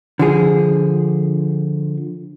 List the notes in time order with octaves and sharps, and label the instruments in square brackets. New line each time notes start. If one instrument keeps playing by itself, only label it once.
[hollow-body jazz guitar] D3 F3 G#4